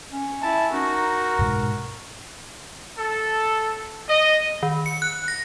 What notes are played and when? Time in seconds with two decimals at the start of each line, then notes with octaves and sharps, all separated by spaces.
0.12 C#4
0.42 E4 A5
0.73 D#4 F#4 A#4
1.39 G#2 B2
2.98 A4
4.09 D#5
4.63 D#3
4.86 C#7
5.02 F#6
5.28 A#6